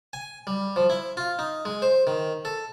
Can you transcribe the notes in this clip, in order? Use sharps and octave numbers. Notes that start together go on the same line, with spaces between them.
G#5
G3
F3
E4
F4
D#4
G#3
C5
D#3
A4